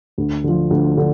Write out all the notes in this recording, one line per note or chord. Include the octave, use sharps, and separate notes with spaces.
D2
D3 F3
D2
D3